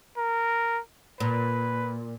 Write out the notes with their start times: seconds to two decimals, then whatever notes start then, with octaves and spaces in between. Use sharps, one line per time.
0.17 A#4
1.20 A#2 B4